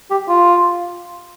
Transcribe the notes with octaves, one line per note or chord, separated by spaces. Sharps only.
G4
F4